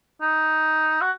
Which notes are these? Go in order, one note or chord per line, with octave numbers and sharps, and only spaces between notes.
D#4
F#4